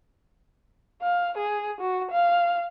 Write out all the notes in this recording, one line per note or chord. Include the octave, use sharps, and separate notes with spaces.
F5
G#4
F#4
F5